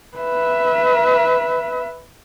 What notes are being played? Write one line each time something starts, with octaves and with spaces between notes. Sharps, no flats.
B4 E5